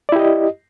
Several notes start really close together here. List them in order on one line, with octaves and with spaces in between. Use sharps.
D5 E4 G4 D#5